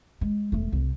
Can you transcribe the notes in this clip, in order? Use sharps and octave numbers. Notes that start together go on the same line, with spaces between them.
G#3
E1 A3
C2